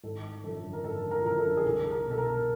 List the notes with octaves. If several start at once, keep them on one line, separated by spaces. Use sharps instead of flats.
G#1 A4
F#2 D3 F3 A4
A#4
G#1 A4
A#4
A4
F#2 D3 F3 A#4
A4
G#4
C2 A4
A#4
B2
A4
A#4